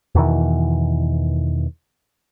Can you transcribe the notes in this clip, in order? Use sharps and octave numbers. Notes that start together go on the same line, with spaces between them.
E2 B2 D#3 E3